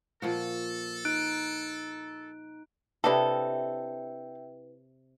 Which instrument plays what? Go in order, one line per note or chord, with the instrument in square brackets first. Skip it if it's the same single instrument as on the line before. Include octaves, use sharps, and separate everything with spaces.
[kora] A#2 F3 F#4 [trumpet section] A4
[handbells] D#4 F#6 D7
[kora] C3 E4 D#5 [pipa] D4 A4 [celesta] B4 [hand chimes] E5 G5